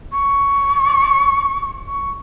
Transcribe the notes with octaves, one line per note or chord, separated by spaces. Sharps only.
C#6
C#6